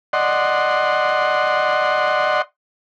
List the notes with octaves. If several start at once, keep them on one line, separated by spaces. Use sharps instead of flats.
D5 D#5 F#5 C6